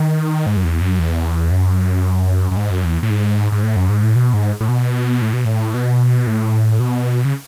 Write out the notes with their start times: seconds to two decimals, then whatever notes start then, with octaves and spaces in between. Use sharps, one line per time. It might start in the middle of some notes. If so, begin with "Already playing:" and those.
Already playing: D#3
0.46 G#2
0.57 F#2
0.64 E2
0.81 F#2
0.99 E2
1.51 F#2
2.51 F#2
2.57 G#2
2.71 F#2
2.84 E2
3.03 A2
3.10 G#2
3.52 G#2
3.63 A2
3.76 F#2
3.89 G#2
4.03 A2
4.16 B2
4.34 G#2
4.61 A2
4.69 B2
5.22 A2
5.33 B2
5.45 A2
5.74 B2
6.27 A2
6.80 B2
7.25 C#3